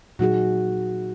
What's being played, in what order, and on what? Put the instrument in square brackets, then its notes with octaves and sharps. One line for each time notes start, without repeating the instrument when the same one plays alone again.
[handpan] A#2 F#3 D#4 G#4 [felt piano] F#4